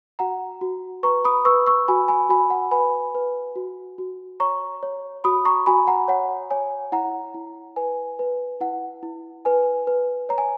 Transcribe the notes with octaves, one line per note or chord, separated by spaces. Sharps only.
F#4 F#5 A#5
F#4
B4 A#5 C#6
B5 D#6
B4 C#6 E6
C#6 E6
F#4 G#5 B5
G#5 B5
F#4 G#5 B5
F#5
B4 G#5 B5
B4
F#4
F#4
C#5 A#5 C#6
C#5
F#4 B5 D#6
A#5 C#6
F#4 G#5 B5
F#5 A#5
C#5 F#5
C#5 G#5
E4 F#5 A#5
E4
B4 G#5
B4
E4 F#5
E4
B4 G#5
B4
C#5 A#5
G#5